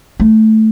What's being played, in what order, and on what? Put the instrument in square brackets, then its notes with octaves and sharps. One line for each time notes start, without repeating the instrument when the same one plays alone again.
[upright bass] A3